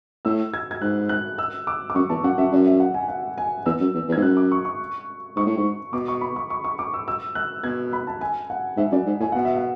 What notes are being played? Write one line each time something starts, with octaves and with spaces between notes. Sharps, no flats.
A2 E6
G#6
G#6
G#2 F#6
F#6
E6
D6
D6
F#2 C#6
E2 A5
F#2 F#5
F#2 E5
F#2 D5
E5
F#5
G#5
F#5
G#5
E2 E6
F#2
E2
E2
G#2 G#6
F#2 F#6
D6
C#6
C#6
G#2 C#6
A2
G#2
B2 D6
C#6
B5
C#6
C#6
C#6
D6
E6
E6
F#6
B2 G#6
B5
A5
G#5
F#5
G#2 E5
F#2 D5
G#2
A2 G#5
B2 F#5
E5
F#5